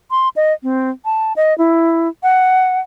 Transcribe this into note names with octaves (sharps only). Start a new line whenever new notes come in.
C6
D#5
C4
A5
D#5
E4
F#5